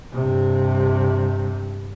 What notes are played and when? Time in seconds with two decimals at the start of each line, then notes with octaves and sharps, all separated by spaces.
0.13 G2 C3